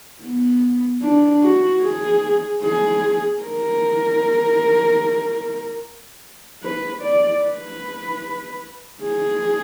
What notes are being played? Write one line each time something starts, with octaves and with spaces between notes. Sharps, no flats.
B3
D4
F#4
G#4
G#4
A#4
B4
D5
B4
G#4